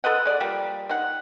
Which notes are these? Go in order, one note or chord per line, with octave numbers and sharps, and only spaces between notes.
A4 B4 D#5 F#5
G#3 D5
F3 G3 A#3
D#3 F#5